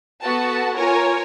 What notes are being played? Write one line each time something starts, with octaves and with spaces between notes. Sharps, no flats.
B3 F#4 A4 B4 A5
F4 A#4 C#5 G#5 A#5